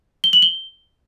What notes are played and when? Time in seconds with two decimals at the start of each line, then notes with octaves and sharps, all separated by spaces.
0.24 G7
0.33 F#7
0.42 G7